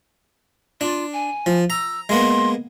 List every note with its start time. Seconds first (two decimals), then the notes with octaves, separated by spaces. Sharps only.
0.81 D4 F4
1.13 G#5
1.46 F3
1.70 A#5 E6
2.09 G#3 A#3 B3 C6